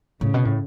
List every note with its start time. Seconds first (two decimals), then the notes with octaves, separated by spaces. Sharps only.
0.21 A2 C#3
0.34 B2
0.45 A2